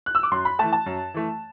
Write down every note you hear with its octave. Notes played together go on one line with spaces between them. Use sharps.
F#6
E6
D6
F#2 C6
B5
E3 A3 A5
A5
F#2
E3 A3